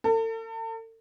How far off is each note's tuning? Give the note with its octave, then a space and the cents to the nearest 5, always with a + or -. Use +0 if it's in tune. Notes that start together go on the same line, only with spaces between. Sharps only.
A4 +40